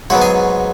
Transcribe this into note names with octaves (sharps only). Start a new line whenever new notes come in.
G#2 F#3 B3 F#4 F#5
G#4 G#5